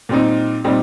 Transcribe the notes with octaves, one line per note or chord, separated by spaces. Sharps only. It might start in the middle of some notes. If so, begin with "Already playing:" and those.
A#2 G3 C4 D#4
A#2 G3 C4 D#4